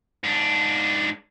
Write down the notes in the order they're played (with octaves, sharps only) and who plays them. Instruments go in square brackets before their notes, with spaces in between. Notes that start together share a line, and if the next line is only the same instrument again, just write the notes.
[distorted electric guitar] G#2 D4